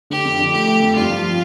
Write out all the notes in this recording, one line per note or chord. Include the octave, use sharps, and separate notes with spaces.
D3 G4
F2
D3
A3 G4
A3
F2
G2 F4
F3